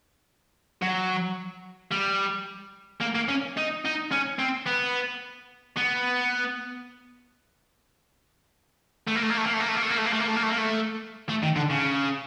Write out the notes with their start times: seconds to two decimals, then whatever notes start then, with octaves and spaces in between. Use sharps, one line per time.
0.82 F#3
1.92 G3
3.01 A#3
3.15 A#3
3.29 C#4
3.57 D#4
3.85 D#4
4.11 C#4
4.39 C4
4.67 B3
5.77 B3
9.08 A3
9.16 A#3
9.23 A3
9.30 A#3
9.37 A3
9.46 A#3
9.54 A3
9.60 A#3
9.69 A3
9.76 A#3
9.82 A3
9.90 A#3
9.98 A3
10.06 A#3
10.13 A3
10.20 A#3
10.28 A3
10.36 A#3
10.43 A3
10.51 A#3
10.58 A3
11.29 A3
11.43 D#3
11.56 D3
11.70 C#3